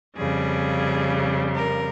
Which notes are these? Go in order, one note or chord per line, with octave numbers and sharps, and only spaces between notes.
F2 C#3 G3 G#4
A#4